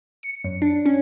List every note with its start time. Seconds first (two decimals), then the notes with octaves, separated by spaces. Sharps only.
0.23 C#7
0.44 F#2
0.62 D4
0.86 C#4